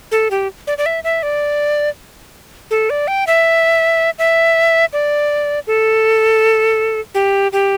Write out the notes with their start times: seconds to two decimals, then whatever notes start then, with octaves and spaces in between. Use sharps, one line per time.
0.12 A4
0.31 G4
0.67 D5
0.78 D5
0.86 E5
1.04 E5
1.23 D5
2.71 A4
2.90 D5
3.08 G5
3.27 E5
4.19 E5
4.93 D5
5.67 A4
7.14 G4
7.53 G4